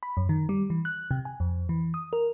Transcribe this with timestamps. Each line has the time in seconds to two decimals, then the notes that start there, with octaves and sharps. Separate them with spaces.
0.03 B5
0.17 F#2
0.29 D#3
0.49 G3
0.70 E3
0.85 F#6
1.11 C3
1.25 G#5
1.40 F2
1.69 E3
1.94 D#6
2.13 A#4